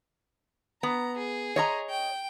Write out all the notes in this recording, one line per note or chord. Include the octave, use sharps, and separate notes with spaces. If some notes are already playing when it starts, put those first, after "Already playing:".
B3 A#5
G#4
C#5 D#5 A#5
G5